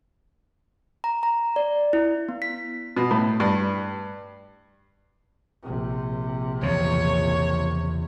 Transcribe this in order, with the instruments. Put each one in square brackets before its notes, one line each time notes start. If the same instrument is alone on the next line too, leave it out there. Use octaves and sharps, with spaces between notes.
[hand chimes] A#5
A#5
D5
E4
B3
B6
[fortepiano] B2
A2
G2
[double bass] A#1 C3
[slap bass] E2 C#3 F3 [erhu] C#5